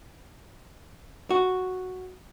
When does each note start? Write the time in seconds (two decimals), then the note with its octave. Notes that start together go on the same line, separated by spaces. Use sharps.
1.31 F#4